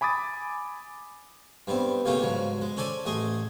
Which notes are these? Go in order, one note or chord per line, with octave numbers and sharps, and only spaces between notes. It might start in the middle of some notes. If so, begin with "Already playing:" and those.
G#5 B5 D6 D#6 A6
G2 G3 B3 C4
A#2 C#3 A3 B3 F4 G4
G#2 C#3 F3 F#3
G#3
C#4 A4 C5 D5 G#5
A1 A3 G#4 D#5 C6